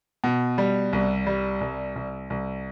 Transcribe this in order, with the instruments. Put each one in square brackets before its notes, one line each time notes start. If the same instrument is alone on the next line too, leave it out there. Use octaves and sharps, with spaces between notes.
[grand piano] B2
G3
C2
G3
C2
C2
C2